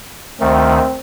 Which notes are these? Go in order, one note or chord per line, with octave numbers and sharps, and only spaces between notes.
D2 D#3 A3 C4